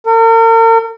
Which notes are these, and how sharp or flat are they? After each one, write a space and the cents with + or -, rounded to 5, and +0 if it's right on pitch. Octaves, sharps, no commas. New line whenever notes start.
A#4 -40